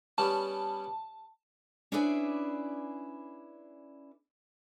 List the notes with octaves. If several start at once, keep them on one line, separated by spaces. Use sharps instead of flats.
G3 B3 C#4 A5
C#4 D4 E4 G#4 B4 D5